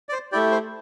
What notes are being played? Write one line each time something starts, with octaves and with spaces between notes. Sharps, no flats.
D5
C5
A3 E4 G4 D5
C5